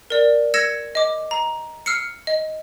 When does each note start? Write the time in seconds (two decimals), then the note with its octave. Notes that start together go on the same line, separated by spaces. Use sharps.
0.10 A#4 D5
0.54 E6 G#6 A#6 C#7 E7
0.95 D#5 D6
1.31 A#5
1.86 E6 F6 C7 C#7
2.27 D#5